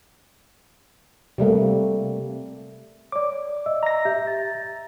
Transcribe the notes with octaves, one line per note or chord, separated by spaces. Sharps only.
C3 G3 A3 A#3
C#5 D5 D6
D#5 E5 E6
A#5 A#6
G4 E5 G6
E5 A6